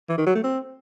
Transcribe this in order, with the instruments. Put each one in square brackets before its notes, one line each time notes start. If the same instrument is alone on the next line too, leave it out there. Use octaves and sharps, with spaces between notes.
[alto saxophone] E3
D#3
F#3
A3
C4